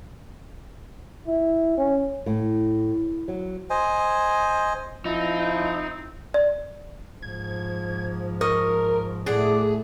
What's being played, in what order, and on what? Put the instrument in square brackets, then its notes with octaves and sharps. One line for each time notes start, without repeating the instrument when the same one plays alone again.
[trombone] E4
C#4
[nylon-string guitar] A2
F#3
[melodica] C5 D#5 G#5
[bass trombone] F3 [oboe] C4 [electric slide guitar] D#4 [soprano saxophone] E4
[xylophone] D5
[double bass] G#2 F3 [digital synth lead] G#6
[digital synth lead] A#4 [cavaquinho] D#5 C#6
[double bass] A2 A3 [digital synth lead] G#4 [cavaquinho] D5 F#5